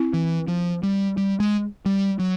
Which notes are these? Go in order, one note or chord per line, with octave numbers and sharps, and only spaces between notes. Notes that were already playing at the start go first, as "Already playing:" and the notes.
Already playing: C4 E4
E3
F3
G3
G3
G#3
G3
F#3